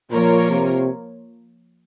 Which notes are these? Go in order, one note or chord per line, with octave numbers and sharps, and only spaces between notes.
A#2 F3 A#3 F4 A#4 C#5
C3